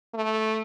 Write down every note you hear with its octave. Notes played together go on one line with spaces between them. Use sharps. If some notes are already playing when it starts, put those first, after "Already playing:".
A3